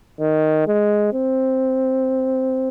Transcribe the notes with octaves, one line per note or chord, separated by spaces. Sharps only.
D#3
G#3
C4